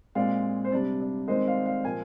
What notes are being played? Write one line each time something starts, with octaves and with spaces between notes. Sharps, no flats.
A#2 G#3 C4 D5 F5
C5
C3 G3 D4 D5
D5
D#3 G#3 C4 C5 D#5
D5 F5
D5 F5
A#2 F3 A#3 F5 G#5